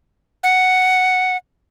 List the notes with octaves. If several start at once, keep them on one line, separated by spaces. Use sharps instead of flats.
F#5